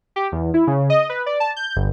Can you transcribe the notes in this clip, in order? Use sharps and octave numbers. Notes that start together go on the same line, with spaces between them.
G4
E2
E4
C#3
D#5
B4
D5
A5
G6
G1